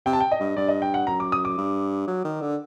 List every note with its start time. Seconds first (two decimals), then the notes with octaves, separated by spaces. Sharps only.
0.06 C3 G5
0.13 A5
0.20 G5
0.31 D#5
0.40 G2
0.57 G2 D5
0.68 D#5
0.82 G5
0.94 F#5
1.07 F#2 A#5
1.20 D6
1.32 D#6
1.45 D6
1.58 G2
2.07 F#3
2.24 D#3
2.41 D3